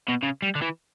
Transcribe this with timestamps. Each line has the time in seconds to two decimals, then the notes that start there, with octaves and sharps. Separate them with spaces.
0.08 B2
0.23 C#3
0.42 G3
0.55 D3
0.62 E3